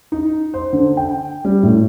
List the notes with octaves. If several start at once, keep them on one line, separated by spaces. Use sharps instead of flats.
D#4
C5
D3
G5
G3
A2